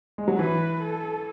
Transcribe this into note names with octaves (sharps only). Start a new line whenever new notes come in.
G#3
F#3
E3 B4
A4